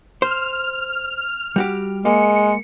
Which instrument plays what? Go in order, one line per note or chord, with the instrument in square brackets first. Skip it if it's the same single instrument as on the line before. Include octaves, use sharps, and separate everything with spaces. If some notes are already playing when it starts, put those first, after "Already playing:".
[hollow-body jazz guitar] C5 [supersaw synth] F6
[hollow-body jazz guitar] G3 F#4 G4
[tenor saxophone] G#3 [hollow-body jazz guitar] A#3 [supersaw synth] C#7